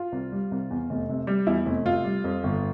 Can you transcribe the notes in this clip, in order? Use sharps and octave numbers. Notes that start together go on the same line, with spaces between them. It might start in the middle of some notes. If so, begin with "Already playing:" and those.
Already playing: F4
C2
G3
C2
E2
F1
C3
G3
E2 E4
F1
C3 F4
G3
F2
G1